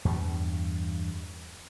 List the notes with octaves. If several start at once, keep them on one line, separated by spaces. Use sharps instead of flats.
E2 G2 G3